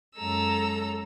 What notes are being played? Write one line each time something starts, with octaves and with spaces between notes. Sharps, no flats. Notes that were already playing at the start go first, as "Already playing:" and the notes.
F#2 G#3 A4 A#5 E6